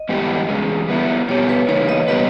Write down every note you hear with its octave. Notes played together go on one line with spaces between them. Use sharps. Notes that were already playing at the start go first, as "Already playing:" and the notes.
Already playing: D#5
G#2 E3 G3 B3 G4
E2 C#3 G#3
G3 B3 E4
B2 G3 B3 G4 C#5
B4
C#3 E3 A#3 D#4 C#5
D#5
B2 G3 B3 G4 B4 D#5